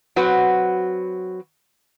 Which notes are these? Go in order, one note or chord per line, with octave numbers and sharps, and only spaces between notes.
F#3 C4 F#4 B4